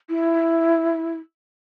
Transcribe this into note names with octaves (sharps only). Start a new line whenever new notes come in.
E4